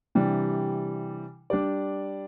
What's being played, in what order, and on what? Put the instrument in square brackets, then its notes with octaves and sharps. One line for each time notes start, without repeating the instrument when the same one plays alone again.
[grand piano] C3 E3 G3 D4
G3 D4 G4 D5